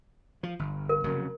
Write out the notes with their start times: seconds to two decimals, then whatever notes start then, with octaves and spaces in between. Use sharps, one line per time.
0.43 F3
0.59 G1
0.89 A#4
1.04 F1 C#3 F#3